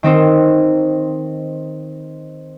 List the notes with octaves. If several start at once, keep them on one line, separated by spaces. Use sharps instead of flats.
D#3 C4 D#4 C5